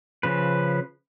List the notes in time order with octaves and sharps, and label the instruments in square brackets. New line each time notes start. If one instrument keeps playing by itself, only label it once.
[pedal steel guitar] C#3 F3 B4